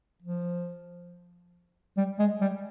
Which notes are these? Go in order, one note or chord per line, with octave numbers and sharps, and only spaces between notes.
F3
G3
G#3
G3